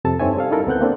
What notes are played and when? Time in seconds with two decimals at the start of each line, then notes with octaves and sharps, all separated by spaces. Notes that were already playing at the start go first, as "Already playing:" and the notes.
0.05 F2 C3 A4 A5
0.20 G2 C4 D#4 C#5 E5 G#5
0.37 G3 A4 F5
0.51 C#4 D#4 E4 A4 A#4
0.67 D2 B3 C4 F#5 F#6 G6
0.81 A#3 C4 D4 A4